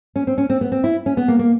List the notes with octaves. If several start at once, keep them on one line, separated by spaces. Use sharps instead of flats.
C#4
C4
C#4
C4
B3
C4
E4
C#4
B3
A#3
A#3